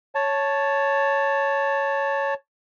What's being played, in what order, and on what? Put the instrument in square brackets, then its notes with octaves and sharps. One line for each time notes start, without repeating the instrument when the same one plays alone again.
[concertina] C#5 A5